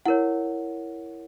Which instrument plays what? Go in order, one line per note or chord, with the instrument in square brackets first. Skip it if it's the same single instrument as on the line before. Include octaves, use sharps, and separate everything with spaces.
[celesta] E4 A#4 C#5 F#5